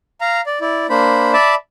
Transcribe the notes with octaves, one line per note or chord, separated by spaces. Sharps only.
F5 A#5
D5
E4 D5
A#3 D4 C5 B5
D5 E5 A5 B5 D6